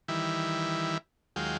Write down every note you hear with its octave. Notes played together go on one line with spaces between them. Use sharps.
D#3 E3 G3 E4
D#2 F#3 G#3 F4 G5